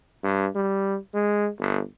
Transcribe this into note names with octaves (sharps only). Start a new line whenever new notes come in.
G2
G3
G#3
G1